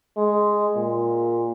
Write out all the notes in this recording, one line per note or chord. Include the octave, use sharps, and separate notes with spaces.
G#3
A#2